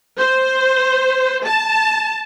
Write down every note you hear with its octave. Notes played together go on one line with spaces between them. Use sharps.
C5
A5